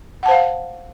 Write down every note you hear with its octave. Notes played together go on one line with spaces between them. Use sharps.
C5 F5 F#5 A5